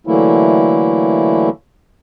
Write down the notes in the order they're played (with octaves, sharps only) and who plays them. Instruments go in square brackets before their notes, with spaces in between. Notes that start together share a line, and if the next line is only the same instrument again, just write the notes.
[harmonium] D3 E3 F#3 A3 A#3 E4